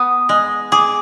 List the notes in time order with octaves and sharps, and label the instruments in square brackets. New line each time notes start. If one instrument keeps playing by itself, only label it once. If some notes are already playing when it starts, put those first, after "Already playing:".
Already playing: [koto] B3 [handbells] D#6
[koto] G#3
[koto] G#4 [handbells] D6